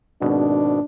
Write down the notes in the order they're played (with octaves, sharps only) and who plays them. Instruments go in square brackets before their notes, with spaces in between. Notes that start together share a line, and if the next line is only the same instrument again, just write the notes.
[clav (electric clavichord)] G#1 B2 [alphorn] D4